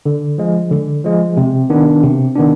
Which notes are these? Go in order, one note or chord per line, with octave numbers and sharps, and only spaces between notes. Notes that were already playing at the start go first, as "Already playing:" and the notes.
D3
F3 G#3
D3
F3 G#3
C3
D#3 B3 D4
C3
D#3 B3 D4